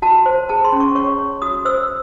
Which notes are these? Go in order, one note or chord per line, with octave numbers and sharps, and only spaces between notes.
F#4 A5
C5
G#4 A5
C6
C#4
C#6
C#5 C#6
C#5
F#4 D#6
C5 E6